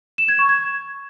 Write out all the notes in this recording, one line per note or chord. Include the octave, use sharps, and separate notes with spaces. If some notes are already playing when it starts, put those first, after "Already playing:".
E7
G#6
C#6
G#6